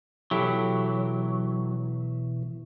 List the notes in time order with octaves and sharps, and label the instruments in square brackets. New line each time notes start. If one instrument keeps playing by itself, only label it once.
[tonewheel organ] B2 E3 [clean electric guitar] F#3 [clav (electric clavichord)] E4 G4 A4